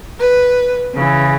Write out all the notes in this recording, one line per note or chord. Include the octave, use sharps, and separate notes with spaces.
B4
C#3 E3